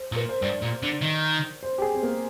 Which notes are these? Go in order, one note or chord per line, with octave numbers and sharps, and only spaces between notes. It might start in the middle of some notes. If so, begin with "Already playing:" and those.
Already playing: C5
A#2 A#4
C5
G2 D5
A#2
D3
D#3
C5
G4
G#4
C4
A#3